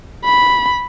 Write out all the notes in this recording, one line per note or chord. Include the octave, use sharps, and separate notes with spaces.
B5